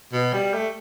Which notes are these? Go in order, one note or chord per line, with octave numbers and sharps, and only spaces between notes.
B2
G3
A3